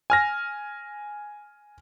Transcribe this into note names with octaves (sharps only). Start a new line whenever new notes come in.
G#5 F6 A#6